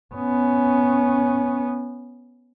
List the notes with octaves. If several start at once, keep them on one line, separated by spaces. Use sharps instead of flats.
B3 C#4